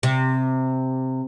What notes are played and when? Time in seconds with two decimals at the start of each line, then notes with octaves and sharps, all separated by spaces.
0.03 C3